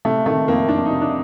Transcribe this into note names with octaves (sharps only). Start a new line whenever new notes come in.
C3 A3
D#3 A3
F2 A#3
F2 D4
D#4
C3
D4